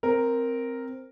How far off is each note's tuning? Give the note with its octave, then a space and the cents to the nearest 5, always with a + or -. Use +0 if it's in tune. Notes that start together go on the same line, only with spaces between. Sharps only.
C4 +0 A#4 +0